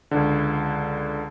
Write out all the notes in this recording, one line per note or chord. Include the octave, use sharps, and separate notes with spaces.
C#2 D3